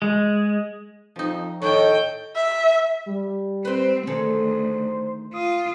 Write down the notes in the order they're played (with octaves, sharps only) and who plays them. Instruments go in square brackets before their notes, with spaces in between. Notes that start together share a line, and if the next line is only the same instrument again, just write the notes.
[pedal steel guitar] G#3
[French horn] F2 [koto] F3 D#4
[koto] A2 D#3 [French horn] A4 [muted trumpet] C#5 [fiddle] D#5 G5
[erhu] E5
[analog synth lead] G3
[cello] C4 [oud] B4 C5
[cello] D2 [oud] D#3 G#4 A4 [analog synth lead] C5
[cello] F4 [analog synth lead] D#6